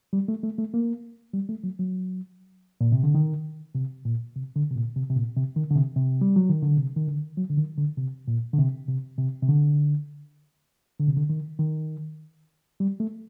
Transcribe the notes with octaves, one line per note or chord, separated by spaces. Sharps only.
G3
A3
A3
A3
A#3
G3
A3
F#3
F#3
A#2
C3
D3
D#3
C3
A#2
C3
D3
C3
A#2
C3
C3
A#2
C3
D#3
D3
C3
C3
G3
F#3
D#3
D3
C3
D#3
D3
F#3
D3
D#3
D3
C3
A#2
D3
C3
C3
C3
C3
D3
D3
C3
D3
D#3
D#3
G3
A3